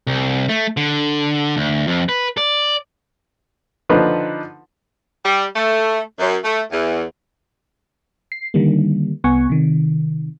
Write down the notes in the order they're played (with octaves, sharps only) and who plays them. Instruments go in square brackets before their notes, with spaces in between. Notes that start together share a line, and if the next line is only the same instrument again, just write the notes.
[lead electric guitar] C2
A3
D3
D2
F2
B4
D5
[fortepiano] D3 F3 D#4 B4
[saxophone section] G3
A3
F#2
A3
E2
[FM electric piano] C7
D3 D#3 G3 A#3
C2 B3 F#5 G#5 C#6
C3 D#3